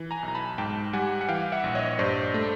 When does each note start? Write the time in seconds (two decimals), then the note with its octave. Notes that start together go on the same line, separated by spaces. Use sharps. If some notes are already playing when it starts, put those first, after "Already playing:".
Already playing: E3
0.11 G#5 A#5
0.23 B1
0.28 A#5
0.35 A5 B5
0.58 G#2 G5 A5
0.93 G3 F#5 G#5
1.21 F#5
1.29 E3 F5 G5
1.52 E5 F#5
1.64 A#1
1.75 C#5 D#5
1.99 G2 C5 D5
2.34 A3